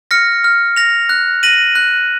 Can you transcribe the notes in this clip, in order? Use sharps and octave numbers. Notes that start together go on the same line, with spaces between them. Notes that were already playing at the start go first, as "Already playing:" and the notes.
F6 A#6 C#7
F6
A#6 F7
F#6
A#6 D#7 F#7
F#6